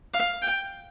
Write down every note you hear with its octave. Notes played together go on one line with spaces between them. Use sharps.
F5
G5